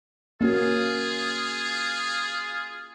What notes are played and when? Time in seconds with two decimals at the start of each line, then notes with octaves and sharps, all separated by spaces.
0.41 A#3 C#4 F4 F#4 G#4